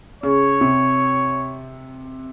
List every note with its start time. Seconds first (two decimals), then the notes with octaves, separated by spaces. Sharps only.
0.23 C#3 C#5
0.61 C3